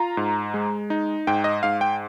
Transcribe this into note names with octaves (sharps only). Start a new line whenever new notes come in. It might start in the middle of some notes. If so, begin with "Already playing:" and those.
Already playing: F4 A#5
G#2
G#3
D#4
G#2 G5
D#5
G#2 F5
G5